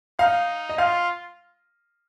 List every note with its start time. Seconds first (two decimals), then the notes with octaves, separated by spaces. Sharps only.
0.19 D#4 F5
0.69 D#5
0.78 F4 F5